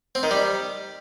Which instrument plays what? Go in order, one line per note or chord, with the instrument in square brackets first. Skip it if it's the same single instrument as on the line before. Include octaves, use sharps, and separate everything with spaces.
[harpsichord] C4
D#3
G3